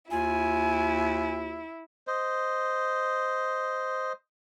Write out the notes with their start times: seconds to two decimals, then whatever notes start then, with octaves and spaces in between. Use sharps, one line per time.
0.11 D#2 E4 F4 G#5
2.07 C5 D#5